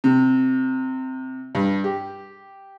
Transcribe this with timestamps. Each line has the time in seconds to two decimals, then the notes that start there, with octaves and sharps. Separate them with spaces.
0.04 C3
1.55 G2
1.84 G4